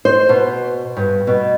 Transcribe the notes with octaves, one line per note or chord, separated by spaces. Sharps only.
C5
B2
G2
B2